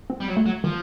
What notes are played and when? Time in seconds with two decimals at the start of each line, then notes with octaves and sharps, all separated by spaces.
0.10 C4
0.20 G3
0.28 F#3
0.37 A3
0.46 F#3
0.64 E3 F3